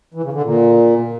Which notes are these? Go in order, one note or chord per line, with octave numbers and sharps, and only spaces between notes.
E3
C#3
D3
A#2